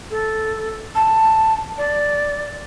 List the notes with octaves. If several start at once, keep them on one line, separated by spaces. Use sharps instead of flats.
A4
A5
D5